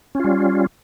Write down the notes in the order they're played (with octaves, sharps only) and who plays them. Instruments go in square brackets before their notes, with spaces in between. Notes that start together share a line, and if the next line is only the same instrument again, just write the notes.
[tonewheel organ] C#4
F4
G3